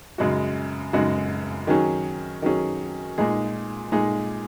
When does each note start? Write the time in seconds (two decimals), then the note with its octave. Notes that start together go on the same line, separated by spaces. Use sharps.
0.18 F#2 C#3 G#3 F#4
0.93 F#2 C#3 G#3 F#4
1.67 D#3 F#3 C#4 G#4
2.42 D#3 F#3 C#4 G#4
3.18 A#2 G#3 D#4 G#4
3.92 A#2 G#3 D#4 G#4